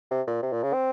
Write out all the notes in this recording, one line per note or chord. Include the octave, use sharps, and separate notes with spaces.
C3
A#2
C3
A#2
C#3
C4